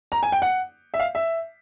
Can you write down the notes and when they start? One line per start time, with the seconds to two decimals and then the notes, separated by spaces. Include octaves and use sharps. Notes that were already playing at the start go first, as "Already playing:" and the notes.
0.12 A#5
0.23 G#5
0.32 G5
0.42 F#5
0.94 E5
1.00 F5
1.15 E5